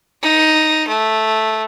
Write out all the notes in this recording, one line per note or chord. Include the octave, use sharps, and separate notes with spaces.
D#4
A3